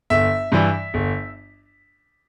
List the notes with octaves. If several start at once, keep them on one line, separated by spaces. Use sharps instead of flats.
G1 E5
G2 E3 G3
G1